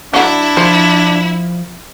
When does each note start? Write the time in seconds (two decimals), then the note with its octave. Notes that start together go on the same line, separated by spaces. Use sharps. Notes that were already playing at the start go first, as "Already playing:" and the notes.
0.14 F#3 D4 E4 F#5
0.57 F3 C5